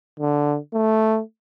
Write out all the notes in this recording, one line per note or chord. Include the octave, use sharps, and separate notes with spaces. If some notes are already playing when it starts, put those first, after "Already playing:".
D3
A3